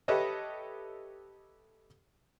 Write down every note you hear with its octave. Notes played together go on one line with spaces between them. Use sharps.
G4 A4 B4 C#5 D#5 E5